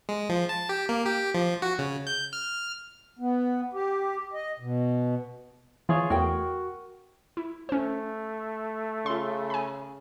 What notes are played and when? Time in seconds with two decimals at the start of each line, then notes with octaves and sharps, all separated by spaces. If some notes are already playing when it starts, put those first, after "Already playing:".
0.09 G#3
0.29 F3
0.49 A5
0.69 G4
0.89 A#3
1.06 G4
1.34 F3
1.62 F#4
1.79 C#3
2.07 G6
2.33 F6
3.19 B3
3.73 G4
4.33 D#5
4.60 B2
5.89 E3 F4 G#4 C#5
6.10 E2 A3 F#4 A#4 G5
7.37 E4
7.69 A3 C#4 C5
9.06 C#3 F4 C6
9.50 G#5 B5